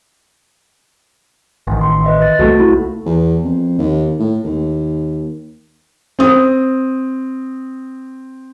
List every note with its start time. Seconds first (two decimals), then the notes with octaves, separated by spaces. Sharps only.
1.67 A1 D#3
1.81 C6
2.04 B4 D#5 E5
2.22 A6
2.39 C2 F3 A3 F#4 A4
2.59 A#3 E4 F#4
3.06 E2
3.44 F2
3.79 D#2
4.19 A2
4.44 D#2
6.19 C4 D#6